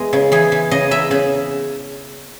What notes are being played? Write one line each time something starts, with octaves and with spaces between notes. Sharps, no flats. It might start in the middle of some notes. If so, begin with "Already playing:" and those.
Already playing: E2 E3 G#3
C#3
E3 G#4
E3
C#3 D#5
E2 E5
C#3